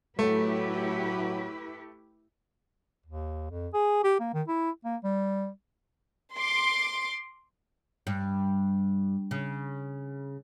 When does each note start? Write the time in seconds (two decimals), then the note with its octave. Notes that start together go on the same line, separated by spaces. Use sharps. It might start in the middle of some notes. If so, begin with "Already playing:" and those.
0.19 A2 F#3 A3 E4 G4 B4
3.06 D#2
3.51 F2
3.73 G#4
4.04 G4
4.20 A#3
4.34 D#3
4.48 E4
4.85 A#3
5.04 G3
6.34 C6 D6
8.07 G2
9.31 C#3